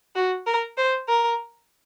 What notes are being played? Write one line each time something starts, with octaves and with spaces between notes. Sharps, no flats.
F#4
A#4
C5
A#4